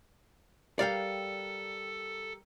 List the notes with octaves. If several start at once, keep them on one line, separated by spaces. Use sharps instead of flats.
G3 G4 A4 A#4 D5 F5 G5